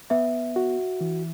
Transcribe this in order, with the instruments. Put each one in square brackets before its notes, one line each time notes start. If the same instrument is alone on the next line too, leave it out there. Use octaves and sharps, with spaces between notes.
[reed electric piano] B3 [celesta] E5
[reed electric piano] F#4
E3